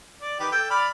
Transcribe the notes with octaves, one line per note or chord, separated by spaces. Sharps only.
D5
D#3 G4 B4
A4 G5
D5 B5 F6